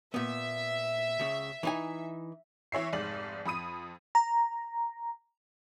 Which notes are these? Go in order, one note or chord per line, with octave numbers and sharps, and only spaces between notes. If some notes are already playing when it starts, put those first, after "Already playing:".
A#2 B3 E5
C#2 C#3
E3 D#4 G#5
E3 C#5 E5 C7
F1 G#2 D5 F#7
F2 B5 D#6 D#7
A#5